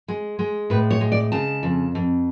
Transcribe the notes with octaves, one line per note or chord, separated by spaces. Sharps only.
G#3
G#3
A2 B4
C#5
G#3
D5
C#3 A5
F2
F2